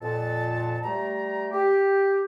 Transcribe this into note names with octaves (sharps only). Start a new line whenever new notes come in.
F2 A#2 A5
G3 A3 A#5
G4